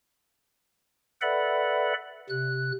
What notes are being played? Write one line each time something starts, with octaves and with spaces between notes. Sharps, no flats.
A4 B4 D5 E5 F#5 B5
C3 F#6